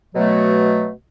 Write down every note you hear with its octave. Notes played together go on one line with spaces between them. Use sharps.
B2 F#3 A3